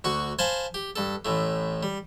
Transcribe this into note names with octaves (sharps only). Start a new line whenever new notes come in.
D2 F#4 C#6
C5 F5 G#5 A5 B5
G4
G2 A4
A1 A2 A3
G3